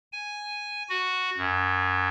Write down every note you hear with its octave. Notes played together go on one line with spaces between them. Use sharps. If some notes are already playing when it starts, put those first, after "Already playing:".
G#5
F#4
F#2